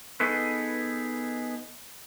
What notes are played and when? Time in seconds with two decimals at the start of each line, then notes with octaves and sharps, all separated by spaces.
0.20 B3 D#4 G#4 A4 B4